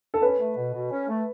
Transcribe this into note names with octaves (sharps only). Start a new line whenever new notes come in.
A4
C#4 B4
A3
B2
B2
C#4
A3